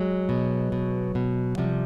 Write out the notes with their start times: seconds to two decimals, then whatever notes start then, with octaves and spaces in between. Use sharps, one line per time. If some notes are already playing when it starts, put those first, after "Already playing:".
Already playing: F#3 G#3
0.29 B2
0.72 B2
1.15 B2
1.58 C3 F3 G3